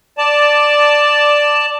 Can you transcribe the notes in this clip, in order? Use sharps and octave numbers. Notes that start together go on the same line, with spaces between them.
D5 A5